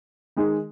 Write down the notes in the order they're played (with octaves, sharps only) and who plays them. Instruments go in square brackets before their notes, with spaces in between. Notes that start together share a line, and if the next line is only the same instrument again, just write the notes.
[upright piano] D#3 G#3 D#4 G#4